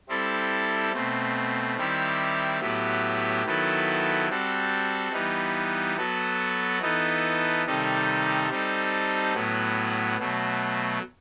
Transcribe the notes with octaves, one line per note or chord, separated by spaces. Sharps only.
G3 C4 E4 A4
B2 A3 C4
D#3 G3 C4 E4 G4
A2 F#3 B3 E4 G4
D#3 F#3 B3 E4 A4
G3 C4 F#4 A4
E3 G3 B3 D#4
F#3 B3 F#4 A4
E3 B3 D#4 A4
C3 D#3 G3 D#4 A4
G3 C4 D#4 A4
A2 F#3 B3
B2 F#3 A3